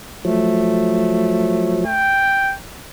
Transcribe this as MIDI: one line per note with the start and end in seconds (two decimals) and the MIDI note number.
0.25 1.85 53
0.25 1.85 54
0.25 2.08 57
1.86 2.54 79